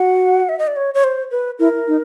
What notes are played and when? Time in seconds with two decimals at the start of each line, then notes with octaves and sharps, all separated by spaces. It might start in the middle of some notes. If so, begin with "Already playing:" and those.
Already playing: F#4 F#5
0.49 E5
0.59 D#5
0.67 D5
0.76 C#5
0.94 C#5
1.04 C5
1.31 B4
1.59 E4 A#4
1.88 D#4